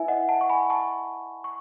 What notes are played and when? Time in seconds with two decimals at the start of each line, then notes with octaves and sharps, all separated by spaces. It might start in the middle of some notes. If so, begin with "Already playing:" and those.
Already playing: E4 B4 E5 G#5
0.08 D#5 F#5
0.29 F#5 A5
0.41 C#6
0.50 G#5 B5
0.70 A5 C#6
1.44 C#6